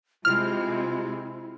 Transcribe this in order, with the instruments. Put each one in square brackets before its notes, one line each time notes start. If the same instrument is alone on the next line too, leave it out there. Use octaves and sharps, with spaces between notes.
[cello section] C3 G#3 C4 [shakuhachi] E4 [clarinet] F4 [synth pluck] F6